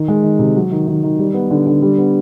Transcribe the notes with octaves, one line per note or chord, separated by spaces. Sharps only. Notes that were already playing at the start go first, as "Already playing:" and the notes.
Already playing: D#3
G#3
D#3
C3
F#3
D#3
D#3
D#3
G3
B3
D3
D3
G3
B3